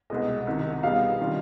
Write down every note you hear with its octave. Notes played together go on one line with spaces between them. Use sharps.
C2 B2 G#3 D#5
C2 C3 D#3
B2 G3 B3 D#4 G#4 F5
C3 D#3 G3 D4 F4